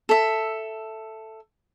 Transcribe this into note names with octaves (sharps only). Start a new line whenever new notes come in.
A4 E5